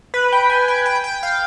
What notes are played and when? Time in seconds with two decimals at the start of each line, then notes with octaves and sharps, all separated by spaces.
0.14 B4
0.32 G5
0.50 G#5
0.68 G5
0.86 G5
1.04 G5
1.23 F5